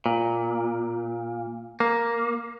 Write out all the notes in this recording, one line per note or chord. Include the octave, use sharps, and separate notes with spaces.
A#2
A#3